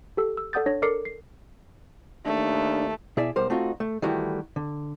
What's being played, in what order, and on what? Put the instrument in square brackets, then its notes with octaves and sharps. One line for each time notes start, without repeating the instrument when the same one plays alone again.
[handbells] G4 A4 E6
E6
A4 D5 F#5 D#6 G6 A6
D4 C#5 A#6
A4 A#4 D5 D6 C7 C#7
C7
[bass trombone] D#2 [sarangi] A3 [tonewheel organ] D4
[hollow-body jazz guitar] B2 E4 G#4 D5 E5
B1 G3 A#4 C5
A3 C4 D#4 F4 F#4
A3
D#3 E3 G3 A3 E4 F#4
D3